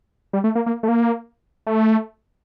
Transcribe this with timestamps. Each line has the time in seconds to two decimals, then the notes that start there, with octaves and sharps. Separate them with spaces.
0.33 G3
0.44 A3
0.55 A#3
0.66 A#3
0.83 A3
0.88 A#3
1.67 A3